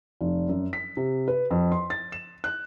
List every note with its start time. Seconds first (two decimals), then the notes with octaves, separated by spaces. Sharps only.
0.21 F1
0.49 F#2
0.73 B6
0.97 C3
1.28 B4
1.51 F2
1.72 C6
1.90 A6
2.12 E7
2.44 F#6